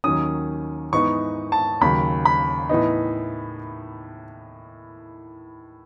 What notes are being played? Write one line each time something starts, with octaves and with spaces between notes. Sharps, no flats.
D#2 D#3 F#3 C#4 D#6
G#2 E3 B3 D#4 C#6
A5
D#2 C#3 F#3 B5
B5
A2 E3 B3 D#4